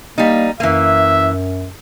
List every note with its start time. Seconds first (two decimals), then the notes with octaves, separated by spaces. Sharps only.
0.18 G3 A#3 D#4
0.60 F#2 E3 A#3 E5